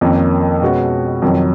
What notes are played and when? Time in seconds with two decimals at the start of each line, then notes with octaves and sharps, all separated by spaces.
0.01 F2 D#3 A#3 C#4
0.61 B2 G#3 C#4 F#4
1.22 F2 D#3 F#3